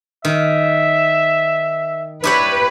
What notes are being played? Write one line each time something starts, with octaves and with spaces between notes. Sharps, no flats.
D#3 E5
D4 E4 G4 B4 C#5